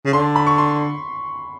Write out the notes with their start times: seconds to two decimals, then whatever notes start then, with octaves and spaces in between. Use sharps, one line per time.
0.05 C#3
0.13 D3 C6
0.36 B5
0.47 C#6
0.58 C6